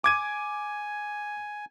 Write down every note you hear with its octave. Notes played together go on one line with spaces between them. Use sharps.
G#5 D6 G#6 D#7